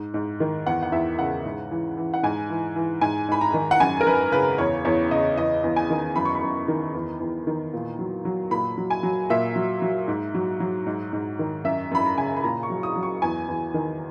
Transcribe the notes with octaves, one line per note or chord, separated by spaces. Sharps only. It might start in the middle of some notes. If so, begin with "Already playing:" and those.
Already playing: G#2
G#2
D#3
E2 F#5
F#5
E2 E5
C#3 F#5
G#2
E3
E3
F#5
G#2 G#5
E3
E3
G#2 G#5
G#2 B5
A#5
D#3
F#5
F#2 G#5
A#4
F#2 B4
C#3 B4
E2 C#5
E2 C#5
C#3 D#5
E2 D#5
E2
G#5
D#3
F#2 B5
C#6
B5
F#2
D#3
E2
E2
D#3
A#2
F#3
F#3
A#2 B5
F#3
G#5
F#3
A#2 E5
F#3
F#3
G#2
F#3
F#3
G#2
G#2
D#3
F#2 E5
F#2 B5
A#5
C#3 G#5
B5
A#2 A#5
C#6
F#3
D#6
F#3
C#6
E2 G#5
E2
D#3